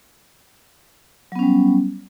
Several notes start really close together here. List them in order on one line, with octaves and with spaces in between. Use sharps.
F#3 B3 C#4 G3